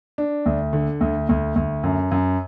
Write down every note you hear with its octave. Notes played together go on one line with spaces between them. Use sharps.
D4
D2
D3
D2
D2
D2
F#2
F#2